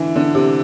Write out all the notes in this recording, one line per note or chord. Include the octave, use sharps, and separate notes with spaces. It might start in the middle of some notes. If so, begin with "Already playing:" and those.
Already playing: D3 E3
D3
C3